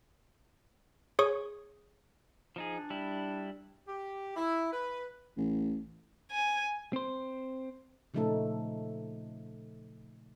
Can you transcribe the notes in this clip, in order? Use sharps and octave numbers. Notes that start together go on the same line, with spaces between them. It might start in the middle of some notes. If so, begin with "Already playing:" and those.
G#4 C#5 C#6 D#6
F3 D#4 G#4
D4
G3 E4
G4
E4
B4
A1
G#5
C4 C5
A#2 C#3 F3 A3 D#4 A4